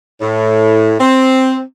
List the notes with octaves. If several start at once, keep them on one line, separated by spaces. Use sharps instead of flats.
A2
C4